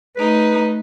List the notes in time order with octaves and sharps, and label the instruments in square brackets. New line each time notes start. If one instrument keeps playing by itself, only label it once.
[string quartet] A3 D#4 [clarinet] B4